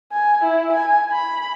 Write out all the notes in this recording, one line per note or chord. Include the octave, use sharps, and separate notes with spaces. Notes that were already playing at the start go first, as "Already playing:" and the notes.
G#5
E4
G#5
B5